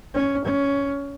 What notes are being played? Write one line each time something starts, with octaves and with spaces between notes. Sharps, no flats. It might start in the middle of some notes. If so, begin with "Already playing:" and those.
C#4
C#4